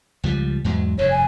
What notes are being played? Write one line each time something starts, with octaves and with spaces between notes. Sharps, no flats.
C#2 F3 G3
E2 G#2 F#3
F1 G2 D3 C#5
G#5